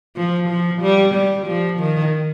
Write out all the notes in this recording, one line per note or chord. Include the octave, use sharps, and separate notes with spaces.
F3
F3
G3
G3
F3
D#3